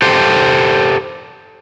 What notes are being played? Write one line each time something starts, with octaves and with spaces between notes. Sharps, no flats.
G4 A4 C5